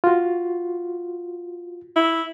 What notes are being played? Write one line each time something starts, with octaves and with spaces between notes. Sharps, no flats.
F4 F#4
E4